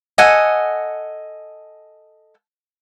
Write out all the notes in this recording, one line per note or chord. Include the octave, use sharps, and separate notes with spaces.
A4 D#5 F#5 G#5